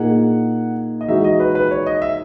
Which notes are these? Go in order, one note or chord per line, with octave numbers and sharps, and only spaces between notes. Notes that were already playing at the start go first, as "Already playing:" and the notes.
Already playing: A#2 A#3 D#4 G#4 F#5
D#5
E3 G#3 D#4 F#4 E5
D#5
B4
B4
C#5
D#5
E5